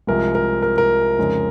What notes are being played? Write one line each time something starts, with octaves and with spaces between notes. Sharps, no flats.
C2 C3 F3 G#3 A#4
A#4
A#4
A#4
F2 C#3 G#3 D#4